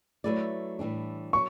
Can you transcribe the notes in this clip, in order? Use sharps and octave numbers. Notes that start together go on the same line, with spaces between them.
F#3 A3 E4 B4 D5
A2 E3 G3 D4
F#3 C#6